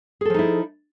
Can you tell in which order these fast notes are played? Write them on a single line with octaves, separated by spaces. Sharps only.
G#4 A4 F3 D#4 E4